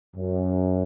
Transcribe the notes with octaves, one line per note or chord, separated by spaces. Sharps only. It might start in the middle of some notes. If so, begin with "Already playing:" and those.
F#2